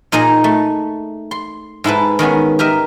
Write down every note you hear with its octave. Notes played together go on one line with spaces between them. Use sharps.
A#2 D#4 G#4 D#5
A3
C6
G#2 E4 A4 B4
D#3 G#3 B3 C#4
G4 A#4 D#5 E5